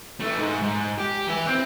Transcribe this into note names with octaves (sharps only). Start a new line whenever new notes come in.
E3 A3
G#2
G#2
G4
E3 E4
C4